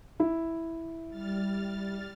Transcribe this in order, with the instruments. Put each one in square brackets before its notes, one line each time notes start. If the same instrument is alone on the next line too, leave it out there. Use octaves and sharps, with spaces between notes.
[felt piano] E4
[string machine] G3 F6 A6